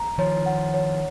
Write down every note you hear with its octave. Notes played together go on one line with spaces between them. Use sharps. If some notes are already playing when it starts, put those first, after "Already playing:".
Already playing: A#5
D#3 F3 C#5
F#5
C#5